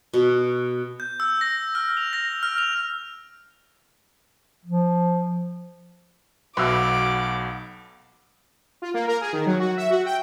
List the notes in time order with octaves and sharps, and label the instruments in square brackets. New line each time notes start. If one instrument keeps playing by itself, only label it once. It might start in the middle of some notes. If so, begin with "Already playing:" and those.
[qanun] B2
[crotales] G6
E6
A#6
F6
F7
A#6
F6
F7
[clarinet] F3
[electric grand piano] B1 B2 [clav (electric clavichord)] B4 E5 [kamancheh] F#5 [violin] D6
[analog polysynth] F4
A#3
A#4
G#4
D#3
F#3
F#4
E5
F#4
G5